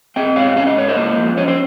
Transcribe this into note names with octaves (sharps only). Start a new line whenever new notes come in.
C4 D#5 G5
G#2 C#5 F5
C#4 F5
D#5
G#2 C#5
C5 D#5
A#3
F2
C#4 C#5
C5